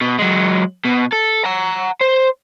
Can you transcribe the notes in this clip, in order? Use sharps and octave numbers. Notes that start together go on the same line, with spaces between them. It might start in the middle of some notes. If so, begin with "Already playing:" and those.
B2
F#3 G#3
B2
A4
F#5 A#5
C5